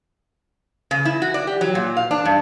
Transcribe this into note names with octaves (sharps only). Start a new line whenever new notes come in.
C#3
E4
F#4
D5
G4
F#3
A#2
F5
D4
G2